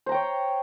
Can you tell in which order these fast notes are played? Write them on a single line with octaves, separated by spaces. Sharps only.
C5 A#5 G5 C#5